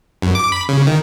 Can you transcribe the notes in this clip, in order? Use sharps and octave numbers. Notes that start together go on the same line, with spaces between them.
F#2
D6
B5
C#3
D#3